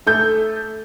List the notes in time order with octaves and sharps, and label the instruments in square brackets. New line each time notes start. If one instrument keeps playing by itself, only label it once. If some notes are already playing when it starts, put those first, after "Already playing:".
[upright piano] A3 A4 G6